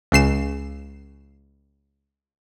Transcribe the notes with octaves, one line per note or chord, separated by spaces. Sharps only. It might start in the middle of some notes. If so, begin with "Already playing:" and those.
C#2 C#3 C7 E7